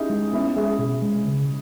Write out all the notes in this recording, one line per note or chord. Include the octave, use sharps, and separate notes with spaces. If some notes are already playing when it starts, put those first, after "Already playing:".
Already playing: C#4 D#4 E4 G4 G#4
G#3
B3 C#4 E4
G#3 E4 G#4
B2
G#3
C#3